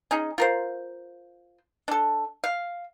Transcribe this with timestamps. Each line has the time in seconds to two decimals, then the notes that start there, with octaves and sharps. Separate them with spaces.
0.11 C#4 D#4 G#4
0.38 F4 A#4 C5
1.88 D4 A4
2.44 F5